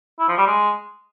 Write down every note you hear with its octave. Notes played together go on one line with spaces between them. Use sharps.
E4
F3
G3
G#3